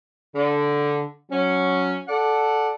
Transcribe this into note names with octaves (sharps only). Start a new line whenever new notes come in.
D3
F#3 C#4
A4 D5 F#5